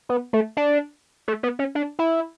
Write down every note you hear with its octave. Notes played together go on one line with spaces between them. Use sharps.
B3
A3
D4
A3
B3
C#4
D4
E4